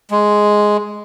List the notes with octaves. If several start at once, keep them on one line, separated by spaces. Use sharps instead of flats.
G#3